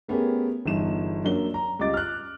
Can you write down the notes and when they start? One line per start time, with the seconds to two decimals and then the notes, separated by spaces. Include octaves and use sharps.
0.08 A3 B3 C#4 G4 G#4 A#4
0.66 G1 E2 D#4 E7
1.24 F#2 F#3 A#3 D4 G7
1.54 A#5
1.79 C#2 G3 D#5 D6 A6
1.94 F6 F#6